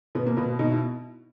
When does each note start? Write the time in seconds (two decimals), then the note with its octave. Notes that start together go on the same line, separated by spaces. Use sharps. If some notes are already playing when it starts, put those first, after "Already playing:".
0.15 B2 B3
0.26 A#3
0.37 B2 B3
0.59 B2 D#4
0.70 E4